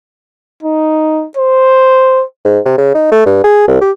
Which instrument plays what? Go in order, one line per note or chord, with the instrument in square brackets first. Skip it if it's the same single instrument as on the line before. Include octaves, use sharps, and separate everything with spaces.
[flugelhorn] D#4
C5
[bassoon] G#2
C3
C#3
D#4
A3
G2
G#4
C2
G4